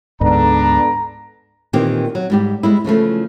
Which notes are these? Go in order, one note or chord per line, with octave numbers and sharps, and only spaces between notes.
D2 G#2 B3 D4 A4 A#5
A#2 D#3 E3 C4 G4
F#3
G#2 G3 G4
G3 G#3 E4
C#3 E3 F3 A3